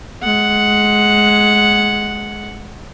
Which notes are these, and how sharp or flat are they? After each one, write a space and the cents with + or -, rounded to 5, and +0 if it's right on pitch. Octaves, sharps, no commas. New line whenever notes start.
G#3 +15 F#5 +0